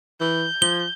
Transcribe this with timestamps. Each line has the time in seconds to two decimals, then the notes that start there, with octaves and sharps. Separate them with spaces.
0.21 E3 G6
0.62 F3 G7